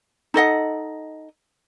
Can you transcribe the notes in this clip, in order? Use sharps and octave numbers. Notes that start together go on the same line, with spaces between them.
D#4 A4 D#5 F#5